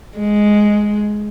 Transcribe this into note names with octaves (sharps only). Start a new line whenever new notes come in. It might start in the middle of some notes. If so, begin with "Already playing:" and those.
G#3